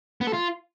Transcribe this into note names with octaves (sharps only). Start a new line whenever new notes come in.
B3
A4
F4